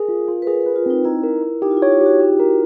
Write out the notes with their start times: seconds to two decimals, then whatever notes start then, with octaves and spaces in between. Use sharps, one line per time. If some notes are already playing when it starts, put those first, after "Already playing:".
Already playing: G#4 A#4
0.08 F4
0.28 F4
0.42 B4
0.47 G#4 A#4
0.61 A#4
0.66 B4
0.76 F4
0.86 C4 D#4
1.05 D#4 E4
1.23 A#4
1.43 A#4
1.62 D#4 G4
1.71 F4
1.77 E4
1.82 C#5
1.91 F4
2.01 G4
2.06 F#4
2.20 G4
2.39 A#4